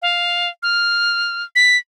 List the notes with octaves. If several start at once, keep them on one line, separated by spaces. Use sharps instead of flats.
F5
F6
B6